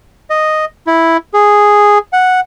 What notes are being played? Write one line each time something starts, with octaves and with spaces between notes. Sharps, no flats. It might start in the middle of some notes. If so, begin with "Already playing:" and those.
D#5
E4
G#4
F#5